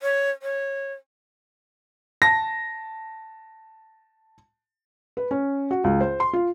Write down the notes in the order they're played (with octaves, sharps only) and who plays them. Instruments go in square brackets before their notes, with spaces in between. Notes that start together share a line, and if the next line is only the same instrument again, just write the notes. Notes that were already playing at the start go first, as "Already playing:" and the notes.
[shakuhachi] C#5
C#5
[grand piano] A5 A#6
[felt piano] B4
C#4
F#4
C#2
C5
C6
F4